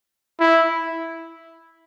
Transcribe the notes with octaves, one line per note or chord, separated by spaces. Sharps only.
E4